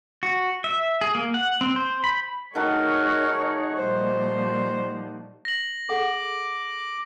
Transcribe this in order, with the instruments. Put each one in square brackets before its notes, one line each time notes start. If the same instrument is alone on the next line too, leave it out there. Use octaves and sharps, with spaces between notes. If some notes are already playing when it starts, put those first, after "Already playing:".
[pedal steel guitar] F#4
E5
G#4
A#3
F#5
C4
C5
B5
[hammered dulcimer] D#3 A3 F#4 [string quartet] D#4 G#4 C#5 [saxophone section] A#4 F#5
[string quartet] A#2 F3 G3 [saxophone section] C5
[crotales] A#6 F#7
[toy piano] G#4 A4 F#5 [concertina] D6